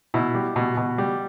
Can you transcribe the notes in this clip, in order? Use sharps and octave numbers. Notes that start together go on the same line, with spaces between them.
B2 E4
G3
B2
B2
G3